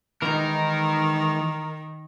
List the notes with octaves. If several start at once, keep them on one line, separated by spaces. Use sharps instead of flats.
D#3 E3 G#3 D#4 A#4